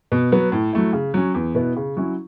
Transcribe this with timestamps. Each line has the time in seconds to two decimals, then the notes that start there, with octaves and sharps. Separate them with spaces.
0.12 B2
0.32 F#3 B3
0.52 A2
0.73 F#3 A3 E4
0.93 C#3
1.14 F#3 C#4
1.34 E2
1.55 B2 B3 E4
1.76 C#3
1.97 F#3 C#4 E4